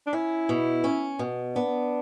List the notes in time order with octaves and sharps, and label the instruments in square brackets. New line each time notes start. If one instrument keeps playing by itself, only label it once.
[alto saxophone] D4
[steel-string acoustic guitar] C#4 [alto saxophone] E4
[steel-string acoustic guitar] B2
C#4
B2
[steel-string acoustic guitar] B3 [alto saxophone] D4